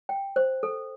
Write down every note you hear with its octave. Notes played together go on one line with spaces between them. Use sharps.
G5
C5
A4